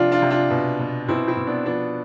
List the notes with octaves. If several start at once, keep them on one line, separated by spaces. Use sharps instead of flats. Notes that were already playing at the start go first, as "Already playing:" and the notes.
Already playing: C3 F3 D4 F4
D4 F4
C3
D4 F4
B2
B2
B2 C4 E4
C4 E4
B2
B3 D4
F3 B3 D4